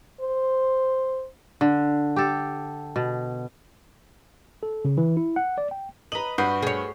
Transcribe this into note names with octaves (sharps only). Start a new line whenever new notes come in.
C5
D3
G4 A4
B2
A4
C#3
E3
E4
F#5
D5
G5
B4 D#5 A#5 F#7
G2 F#4 B4 C#6 D#6 G6 C7
G#4 C#5